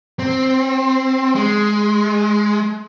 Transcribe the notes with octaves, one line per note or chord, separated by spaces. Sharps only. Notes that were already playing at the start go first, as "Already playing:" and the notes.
C4
G#3